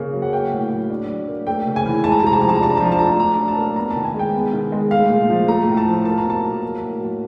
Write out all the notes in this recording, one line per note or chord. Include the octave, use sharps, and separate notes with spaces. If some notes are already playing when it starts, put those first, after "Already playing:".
Already playing: C#3 A#3
F#3
F#5
A#3 G5
A2
F#3
D4
F#3
A#3
A3 G5
C#3
G#5
E3
G#3 A5
A#5
A5
C3 A#5
A5
F3 A#5
A5
A#5
D4 A5
A#5
A5
F3
A#5
A5
A3 A#5
A5
D4 A#5
F#3
A5
A#3
B3 A#5
A5
D#3
G#5
G#3
G5
B3
D#3
G#3
A3 F5
A#2
F3
A3 A#5
A2
A5
F3
A#3 A5
A#5
B2 A5
F#3
A#3
A2
F#3